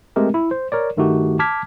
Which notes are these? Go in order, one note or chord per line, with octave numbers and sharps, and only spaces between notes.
G#3 A3 C4 G4 A#4
E4
C5
A#4 C#5 D5
G2 D#3 A3 D#4 F#4 G4
A5 D6 F6 G#6 B6